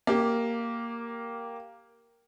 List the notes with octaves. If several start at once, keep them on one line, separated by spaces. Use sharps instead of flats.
A#3 G4